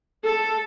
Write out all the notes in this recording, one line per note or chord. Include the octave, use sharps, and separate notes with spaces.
A4